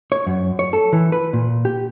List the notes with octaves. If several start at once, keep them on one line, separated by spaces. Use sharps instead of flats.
C#5
F#2
C#5
A4
E3
B4
A#2
G4